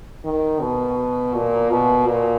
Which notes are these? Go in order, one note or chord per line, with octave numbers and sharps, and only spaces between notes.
D#3
B2
A#2
B2
A#2